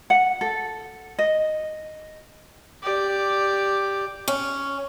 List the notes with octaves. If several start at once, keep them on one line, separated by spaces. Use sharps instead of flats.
F#5
A4
D#5
G4 D5
C#4